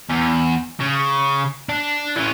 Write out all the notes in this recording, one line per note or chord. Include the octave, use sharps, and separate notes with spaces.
E2
C#3
D4
E3 C#4